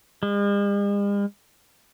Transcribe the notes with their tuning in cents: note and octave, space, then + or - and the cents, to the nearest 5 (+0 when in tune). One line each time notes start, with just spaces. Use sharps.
G#3 -45